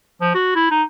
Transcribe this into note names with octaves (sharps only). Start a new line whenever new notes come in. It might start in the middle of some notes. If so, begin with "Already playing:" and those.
F3
F#4
E4
D#4